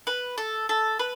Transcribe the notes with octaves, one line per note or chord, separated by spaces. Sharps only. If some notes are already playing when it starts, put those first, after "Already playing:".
B4
A4
A4
B4